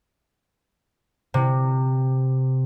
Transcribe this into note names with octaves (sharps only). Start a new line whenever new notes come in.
C3